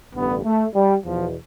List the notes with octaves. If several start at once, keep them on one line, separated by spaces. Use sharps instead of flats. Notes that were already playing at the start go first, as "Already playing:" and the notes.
A1 G2 D3 B3
A3
G3
E2 B2 F3